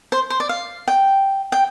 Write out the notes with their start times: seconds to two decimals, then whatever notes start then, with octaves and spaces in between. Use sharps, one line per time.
0.12 C5
0.30 C5
0.40 D5
0.49 F5
0.88 G5
1.52 G5